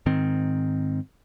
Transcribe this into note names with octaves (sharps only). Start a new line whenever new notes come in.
G#2 D#3 C4